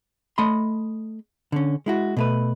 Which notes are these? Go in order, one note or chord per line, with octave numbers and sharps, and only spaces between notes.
A3 D#5 B5 C6
D3 C#4
G#3 E4 F#4
B2 A3 B4